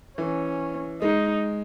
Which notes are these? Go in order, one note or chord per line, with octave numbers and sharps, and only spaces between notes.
E3 C#4
G#3 D#4